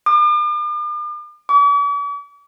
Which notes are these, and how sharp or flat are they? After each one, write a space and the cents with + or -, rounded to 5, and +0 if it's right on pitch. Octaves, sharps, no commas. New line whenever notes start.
D6 +45
D6 -45